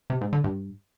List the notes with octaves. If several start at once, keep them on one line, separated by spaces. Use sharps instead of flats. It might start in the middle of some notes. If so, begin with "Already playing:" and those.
C3
G#2
D3
G2